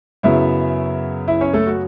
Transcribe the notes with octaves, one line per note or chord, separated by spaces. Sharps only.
F#2 C#3 F#3 B3 E4 E5
E4 E5
C#4 C#5
A3 A4
F#4